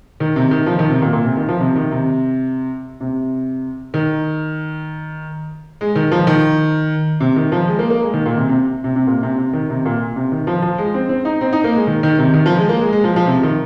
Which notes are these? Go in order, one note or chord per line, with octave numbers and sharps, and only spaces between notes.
D#3
C3
D#3
F3
D#3
C3
A#2
A#2
C3
D#3
F3
C3
D#3
C3
C3
D#3
G#3
D#3
F3
D#3
C3
D#3
F3
G#3
A#3
A#3
G#3
D#3
A#2
C3
C3
C3
C3
A#2
C3
C3
D#3
C3
A#2
C3
D#3
F3
F3
G#3
C4
C4
D#4
C4
D#4
A#3
G#3
D#3
D#3
C3
D#3
F3
G#3
A#3
G#3
G#3
F3
F3
C3
D#3